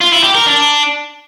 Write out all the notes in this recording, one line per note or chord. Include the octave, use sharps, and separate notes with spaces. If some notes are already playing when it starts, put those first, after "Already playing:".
F4
E4
G4
A#4
D4